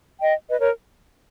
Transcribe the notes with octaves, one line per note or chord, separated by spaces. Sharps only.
D#5 G5
B4 D#5
A#4 C#5